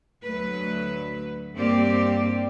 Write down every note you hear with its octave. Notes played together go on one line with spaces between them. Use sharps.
D2 F#3 A3 B4
G2 A#3 C4 G4 D5